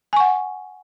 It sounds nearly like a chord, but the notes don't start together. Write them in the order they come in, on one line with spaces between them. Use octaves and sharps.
G#5 C#6 F#5